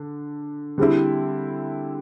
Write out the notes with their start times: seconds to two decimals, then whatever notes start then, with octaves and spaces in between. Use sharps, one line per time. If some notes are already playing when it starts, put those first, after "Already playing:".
Already playing: D3
0.78 D3 G3 C4 E4